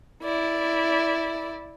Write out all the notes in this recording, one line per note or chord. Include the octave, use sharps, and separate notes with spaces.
E4 D5